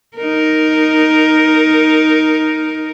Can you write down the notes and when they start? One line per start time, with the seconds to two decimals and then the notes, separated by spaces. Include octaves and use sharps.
0.17 D#4 A#4